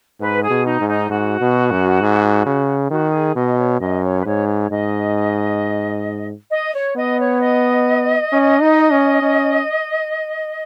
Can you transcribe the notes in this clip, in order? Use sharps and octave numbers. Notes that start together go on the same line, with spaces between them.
G#2 B4
G#4
B2
D#4
G#2
D#4
G#2 F#4
B2
F#2
G#2
C#3
D#3 F#4
G#4
B2 D#5
C#5
F#2 D#5
C#5
B4
G#2 C#5
C#5
G#2 D#5
D#5
C#5
B3 D#5
C#5
D#5
C#4
D#4
C#4
C#4